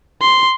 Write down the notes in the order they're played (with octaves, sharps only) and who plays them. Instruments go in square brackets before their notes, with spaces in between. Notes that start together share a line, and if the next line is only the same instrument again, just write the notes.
[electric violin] C6